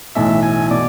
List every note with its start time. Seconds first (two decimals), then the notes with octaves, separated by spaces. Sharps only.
0.15 B1 A2 E3 E5
0.43 G#5
0.70 B2 D5